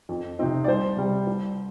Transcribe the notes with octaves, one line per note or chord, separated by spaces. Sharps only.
F2
C3 F3 C4 D#4
D5
C2 C5
C3 G3
C2